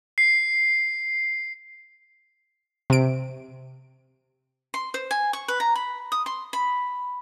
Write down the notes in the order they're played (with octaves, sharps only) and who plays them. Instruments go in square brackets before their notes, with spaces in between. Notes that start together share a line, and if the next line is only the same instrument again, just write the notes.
[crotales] C7
[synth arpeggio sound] C3 D7
[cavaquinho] C6
C5
G#5
C#6
B4
A#5
B5
D#6
C6
B5